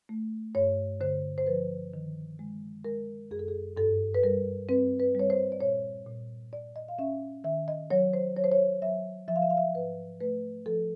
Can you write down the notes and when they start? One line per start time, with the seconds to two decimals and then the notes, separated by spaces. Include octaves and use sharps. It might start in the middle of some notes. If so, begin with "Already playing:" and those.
0.09 A3
0.55 G2 C#5
1.01 D3 C5
1.38 C5
1.47 F3 B4
1.94 D#3
2.39 G#3
2.85 G#3 A#4
3.31 F#2 G#4
3.39 A4
3.48 G#4
3.77 G2 A4
4.15 B4
4.23 G3 A#4
4.69 C4 B4
5.00 B4
5.15 G3 C#5
5.30 C5
5.52 D5
5.61 A#2 C#5
6.07 A#2
6.53 A#2 D5
6.76 D#5
6.88 F5
6.99 C#4 E5
7.44 D#3 E5
7.68 D#5
7.91 F#3 C#5
8.13 C5
8.37 F#3 C#5
8.44 C5
8.51 C#5
8.82 F#3 E5
9.28 F3 E5
9.36 F5
9.42 E5
9.50 F5
9.57 E5
9.74 G#2 B4
10.20 A3 B4
10.66 F3 A4